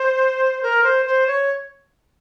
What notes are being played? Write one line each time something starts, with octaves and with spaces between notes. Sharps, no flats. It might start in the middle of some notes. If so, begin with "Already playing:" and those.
Already playing: C5
A#4
C5
C5
C#5